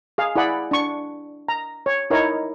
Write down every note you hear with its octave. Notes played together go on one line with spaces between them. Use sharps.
G#4 F5
E4 G#4 D5 F#5 B5
D4 C#6
A#5
C#5
D#4 E4 A#4 C#5 D#5